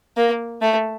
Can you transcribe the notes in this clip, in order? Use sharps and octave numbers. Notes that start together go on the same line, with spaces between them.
A#3
A3